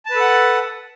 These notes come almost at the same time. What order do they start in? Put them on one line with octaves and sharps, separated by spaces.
A5 B4 A4 F#5